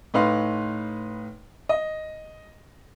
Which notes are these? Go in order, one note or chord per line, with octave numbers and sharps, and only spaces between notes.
A2 D#4 B4 F5 C6
D#5